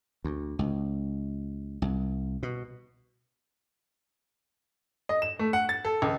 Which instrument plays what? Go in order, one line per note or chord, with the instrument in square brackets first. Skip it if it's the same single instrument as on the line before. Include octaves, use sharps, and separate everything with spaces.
[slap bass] D2
C#2
C2
B2
[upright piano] D#5
E7
A3
F#5
A6
A4
C#2